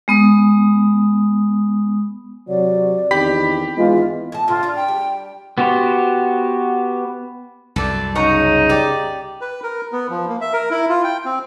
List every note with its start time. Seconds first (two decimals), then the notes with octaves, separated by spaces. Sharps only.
0.08 G#3 B3 D#6
2.48 C3 F#3 D5
3.11 E2 D#3 C4 G4 B5 B6
3.77 G#1 E3 G#3 B3 F4
4.32 A2 A5
4.48 A2 D3 F4
4.63 D4 A#5
4.76 G5
4.88 G3
5.58 B3 F#4 G4 C5
7.76 C2 F#2 A4 D5
8.15 C#3 D#4 C#5 F#5 A#5
8.69 G4 D5
9.41 B4
9.63 A#4
9.93 B3
10.10 F3
10.29 A#3
10.41 E5
10.53 A#4
10.71 E4
10.89 F4
11.04 G5
11.25 C4